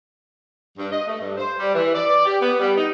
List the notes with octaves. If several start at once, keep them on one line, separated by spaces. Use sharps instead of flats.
G2
D#5
A3
G2
C5
G3
E3
D5
G4
B3
G3
D#4